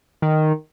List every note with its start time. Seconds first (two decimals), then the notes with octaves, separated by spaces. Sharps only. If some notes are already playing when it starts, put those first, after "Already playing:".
0.22 D#3